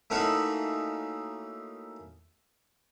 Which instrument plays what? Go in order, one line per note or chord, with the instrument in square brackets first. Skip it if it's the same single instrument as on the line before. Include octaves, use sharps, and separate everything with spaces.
[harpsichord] A3 A#3 C#4 D#4 E4 F#4